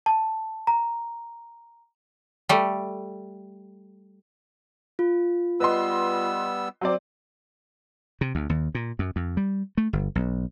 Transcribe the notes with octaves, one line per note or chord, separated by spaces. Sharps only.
A5
A#5
G3 A3
F4
G3 B3 B4 D#5 C6 E6
F#3 C4 D5
C3
D2
D#2
A#2
F#2
F2
G3
A3
G1
B1